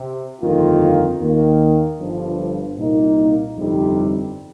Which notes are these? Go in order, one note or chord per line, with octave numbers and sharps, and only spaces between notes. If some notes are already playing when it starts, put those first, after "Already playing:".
Already playing: C3
G1 F2 D#3 A#3 F4
D#2 D#3 A#3
G1 G2 F3
C2 A#2 A#3 D#4 A#4
G1 F2 C3 G3 D#4